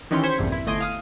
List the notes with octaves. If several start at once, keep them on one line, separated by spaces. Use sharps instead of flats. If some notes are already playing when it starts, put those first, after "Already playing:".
D#3 E3 C#4 G4 C6
C5 G#6 B6 C#7
A#1 E2 G2 C3
E4
G1 A3 D#5 G#5 C6 D7
F5 D#6 F6